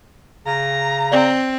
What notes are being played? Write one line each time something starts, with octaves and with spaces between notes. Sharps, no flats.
C#3 A#5
C4 D5